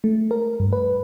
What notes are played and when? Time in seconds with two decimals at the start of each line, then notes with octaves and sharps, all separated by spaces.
0.04 A3
0.31 A#4
0.60 G2
0.73 B4